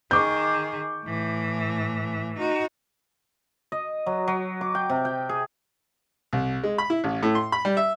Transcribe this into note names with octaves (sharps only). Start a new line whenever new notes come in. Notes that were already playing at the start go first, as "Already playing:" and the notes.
D#3 G#4 C#6 D6 G6
A2 E3
D#4 F#4
D#5
F#3
F#3
D6
G5
C3
G5
G#4
C2
G#3
B5
E4
A1
A2
C6
B5
G3
E5